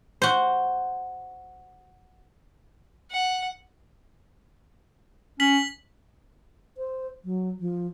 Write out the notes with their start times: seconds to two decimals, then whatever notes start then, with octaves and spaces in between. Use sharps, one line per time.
0.22 F#4 C5
3.11 F#5
5.40 C#4 B6 F#7
6.77 C5
7.25 F#3
7.60 F3